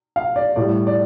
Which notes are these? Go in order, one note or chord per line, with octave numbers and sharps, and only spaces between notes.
F5
D5
A2 G3 D5
D5